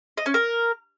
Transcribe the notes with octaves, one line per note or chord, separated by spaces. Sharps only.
D#5
C#4
A#4